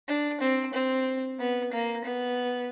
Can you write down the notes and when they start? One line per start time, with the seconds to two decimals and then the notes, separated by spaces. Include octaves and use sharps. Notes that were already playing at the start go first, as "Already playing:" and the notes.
0.08 D4
0.41 C4
0.73 C4
1.39 B3
1.72 A#3
2.05 B3